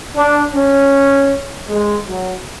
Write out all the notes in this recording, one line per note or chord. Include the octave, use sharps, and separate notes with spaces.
D4
C#4
G#3
F#3